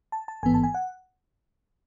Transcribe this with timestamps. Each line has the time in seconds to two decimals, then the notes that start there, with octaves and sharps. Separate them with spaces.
0.12 A5
0.28 A5
0.43 A1 G#2 E3 B3 G#5
0.54 A5
0.63 G#5
0.74 F#5